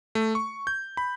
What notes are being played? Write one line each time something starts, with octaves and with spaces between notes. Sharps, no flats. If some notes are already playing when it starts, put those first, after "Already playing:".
A3
C#6
G6
B5